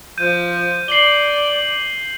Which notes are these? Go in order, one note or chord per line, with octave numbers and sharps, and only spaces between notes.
F3 G6 D#7
D5 C7 F#7 G7